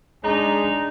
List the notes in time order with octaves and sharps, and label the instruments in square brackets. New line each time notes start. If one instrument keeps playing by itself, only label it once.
[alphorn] G#3 [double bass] D4 [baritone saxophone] D#4 [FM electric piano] A#5